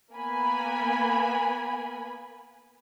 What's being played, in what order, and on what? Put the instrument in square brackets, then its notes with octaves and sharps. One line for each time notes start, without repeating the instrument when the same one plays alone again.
[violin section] A#3 B3 G#5 B5